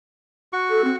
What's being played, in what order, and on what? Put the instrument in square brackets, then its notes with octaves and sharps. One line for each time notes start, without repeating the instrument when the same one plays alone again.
[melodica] F#4 C#6
[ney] A4
C4